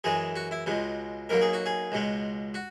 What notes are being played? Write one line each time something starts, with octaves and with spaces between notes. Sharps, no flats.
F#2 E3 G#3 G#4
F#4
E4
C#2 B2 G#3
B1 B2 F#3 A#3 A#4
G#4
F#4
G#4
C#2 B2 G#3
F#4